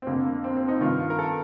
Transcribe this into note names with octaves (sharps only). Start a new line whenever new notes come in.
C4
F2 D3 A#3
A#3
C4
C4
D#4
G2 D#3 F4
F4
A#4
A4